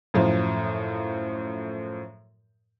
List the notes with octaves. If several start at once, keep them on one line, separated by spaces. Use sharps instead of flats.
F#2 A2 F3